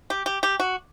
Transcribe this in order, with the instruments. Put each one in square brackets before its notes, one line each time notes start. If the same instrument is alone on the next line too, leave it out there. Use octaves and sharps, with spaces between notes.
[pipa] G4
G4
G4
F#4